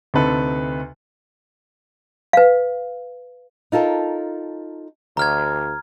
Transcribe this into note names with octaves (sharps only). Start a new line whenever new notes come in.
D2 C3 D#4 A4 B4
B4 F5
D#4 F4 A4 A#4
D2 A#5 F6 G#6